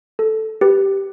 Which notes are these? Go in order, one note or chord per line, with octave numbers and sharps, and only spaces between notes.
A4
G4 B4